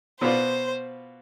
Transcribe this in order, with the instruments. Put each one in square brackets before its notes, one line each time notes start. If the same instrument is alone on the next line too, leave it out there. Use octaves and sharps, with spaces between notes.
[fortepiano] B2 B3 F4 B4 D5 [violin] C5